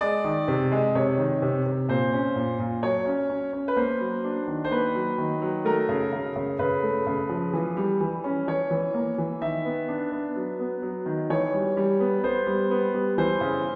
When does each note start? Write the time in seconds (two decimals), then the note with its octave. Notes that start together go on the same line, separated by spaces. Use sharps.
0.01 G#3 D5
0.24 D#3
0.48 C3
0.72 G#3
0.95 C3 C#5
1.18 D#3
1.42 C3
1.66 C3
1.89 A#2 C5
2.13 C#4
2.36 A#2
2.59 A#2
2.83 F#3 C#5
3.06 C#4
3.30 C#4
3.53 C#4
3.68 B4
3.76 A#3 C5
4.00 F#3
4.24 D4
4.48 D#3
4.64 C5
4.71 A#3 B4
4.95 F#3
5.18 D#3
5.42 F#3
5.65 A3 A#4
5.89 C#3
6.13 C#3
6.36 C#3
6.59 C#3 B4
6.83 A3
7.07 C#3
7.29 F3
7.53 E3
7.77 G3
8.01 E3
8.24 C#4
8.47 E3 C#5
8.71 E3
8.94 A#3
9.18 E3
9.41 D#3 E5
9.65 B3
9.88 D4
10.12 B3
10.36 F#3
10.59 B3
10.82 F#3
11.06 D#3
11.30 E3 C#5
11.53 G3
11.77 G3
12.00 B3
12.23 B3 C5
12.47 G3
12.71 B3
12.94 G3
13.18 E3 C5
13.41 C#3